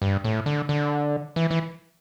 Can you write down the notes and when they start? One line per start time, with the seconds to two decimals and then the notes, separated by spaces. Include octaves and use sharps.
0.02 G2
0.24 A2
0.46 D3
0.69 D3
1.36 E3
1.51 E3